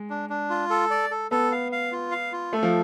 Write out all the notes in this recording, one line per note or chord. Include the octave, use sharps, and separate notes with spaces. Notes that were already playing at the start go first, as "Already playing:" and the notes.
Already playing: G#3
D4
D4
F4
A4
D5
A4
B3 A4
F5
F5
F4
F5
F4
A3 A4
F3